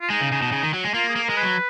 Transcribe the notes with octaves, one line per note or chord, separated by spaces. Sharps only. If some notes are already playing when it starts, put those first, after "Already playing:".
F4
G#3 D#4
C#3
C#3
B2
C#3
D#3
F#3
G#3
A#3 F4
G#4
A#3
A#4
G#3
B4
F#3